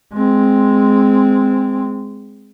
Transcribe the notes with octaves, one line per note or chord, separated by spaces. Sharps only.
G#3 C4